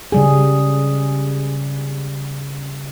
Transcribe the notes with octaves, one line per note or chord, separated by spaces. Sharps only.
C#3 G3 G#4